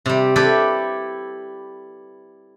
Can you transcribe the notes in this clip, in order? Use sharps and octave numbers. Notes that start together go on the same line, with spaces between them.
C3 G3
E4 G4 A4 B4 D5